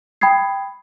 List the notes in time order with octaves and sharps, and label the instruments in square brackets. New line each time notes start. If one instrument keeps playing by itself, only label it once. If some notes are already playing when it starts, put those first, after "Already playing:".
[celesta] G5 B5 D#6 G#6 C7